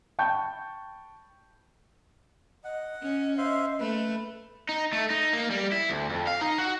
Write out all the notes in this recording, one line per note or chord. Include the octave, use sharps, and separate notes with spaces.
G5 A5 B5 C#6 G6
D#5 F#5
C#4
C5 E5 F5
A3 B4
D#4
A3
D#4
A#3
G3
E4
D2
F2
F5
D#4
F#4